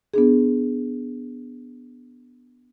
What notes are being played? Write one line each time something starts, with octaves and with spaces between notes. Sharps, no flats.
B3 D4 G#4